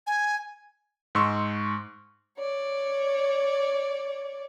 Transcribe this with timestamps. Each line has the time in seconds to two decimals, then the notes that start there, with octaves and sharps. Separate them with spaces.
0.07 G#5
1.15 G#2 G#3 C6 C#6 E6
2.38 C#5 D5